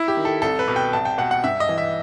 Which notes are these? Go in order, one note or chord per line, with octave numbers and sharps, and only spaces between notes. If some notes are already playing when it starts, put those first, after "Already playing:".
Already playing: E4
G4
D#3
A4
C2 A4
B4
B2
G5
C2 A5
G5
B2 F#5
F#5
G2 E5
D#5
E3
E5